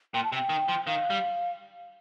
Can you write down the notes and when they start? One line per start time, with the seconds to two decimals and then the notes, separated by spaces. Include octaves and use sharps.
0.14 A#2 G5
0.24 A5
0.32 C3 G5
0.50 D#3
0.68 F3
0.87 D#3 F5
1.10 G3